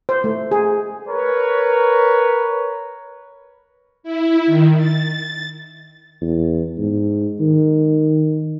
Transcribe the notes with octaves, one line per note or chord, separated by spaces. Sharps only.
C5
A3
G#4
A#4 B4 C#5
E4
D#3
A6
E2
G#2
D#3